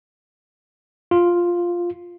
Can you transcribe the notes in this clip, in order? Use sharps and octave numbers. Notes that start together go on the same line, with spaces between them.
F4